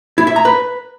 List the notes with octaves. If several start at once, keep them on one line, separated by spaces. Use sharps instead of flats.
E4
E5
A#5
B4